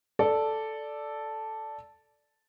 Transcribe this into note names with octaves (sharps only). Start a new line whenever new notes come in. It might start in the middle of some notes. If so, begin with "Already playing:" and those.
A4 D5